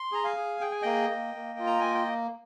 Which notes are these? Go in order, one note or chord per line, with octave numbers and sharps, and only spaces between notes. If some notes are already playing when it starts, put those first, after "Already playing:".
Already playing: C6
G#4 A#5
F5 G#5
G#4
G#4 G5
G#5
A#3 D#5 G5
A#3
A#3
F4
A#5
A#3 G#5
G5